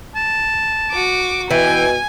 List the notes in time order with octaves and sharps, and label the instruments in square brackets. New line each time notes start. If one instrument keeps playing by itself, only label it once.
[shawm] A5
[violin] F#4 D6
[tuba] B2 [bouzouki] E3 [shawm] G5 [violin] G#5